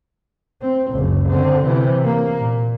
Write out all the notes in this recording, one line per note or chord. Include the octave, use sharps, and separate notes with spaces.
C4
F#1 C#2
D3 C4
C3 E3
A#3
A#2